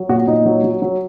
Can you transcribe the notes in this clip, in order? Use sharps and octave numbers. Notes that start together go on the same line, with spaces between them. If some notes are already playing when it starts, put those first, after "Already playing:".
Already playing: F#3
A#2 F#4
A#2 D#4
F#3
F#3
F#3